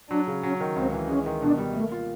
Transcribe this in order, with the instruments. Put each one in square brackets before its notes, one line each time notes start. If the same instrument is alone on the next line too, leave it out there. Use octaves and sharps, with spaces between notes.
[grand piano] F#3 [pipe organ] D4
[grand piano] C#3
[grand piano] F#3 [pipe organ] C#4
[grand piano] D#3
[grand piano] C#2 [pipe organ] C4
[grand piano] E3
[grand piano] G#3 [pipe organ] C#4
[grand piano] D#3
[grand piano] B2 [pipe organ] D4
[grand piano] G3
[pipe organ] A3 [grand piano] A#3
[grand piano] F4